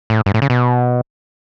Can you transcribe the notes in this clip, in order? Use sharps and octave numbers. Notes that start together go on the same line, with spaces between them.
A2
G2
A2
C#3
B2